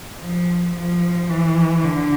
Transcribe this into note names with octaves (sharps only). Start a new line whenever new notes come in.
F3
F3
E3
D3